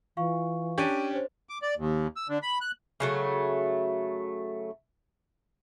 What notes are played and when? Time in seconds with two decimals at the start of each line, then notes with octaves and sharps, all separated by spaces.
0.17 E3 F4 F5 C#6
0.78 C#4 D4 G4 C#6 D7 D#7
1.11 C5 C#5
1.49 D6
1.62 D5
1.77 D#2
2.16 E6
2.29 D3
2.43 B5
2.61 F#6
3.00 C#3 F#3 A3